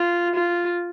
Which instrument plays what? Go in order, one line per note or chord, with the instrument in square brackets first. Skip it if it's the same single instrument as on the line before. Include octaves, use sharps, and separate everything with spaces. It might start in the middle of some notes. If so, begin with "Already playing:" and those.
Already playing: [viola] F4
F4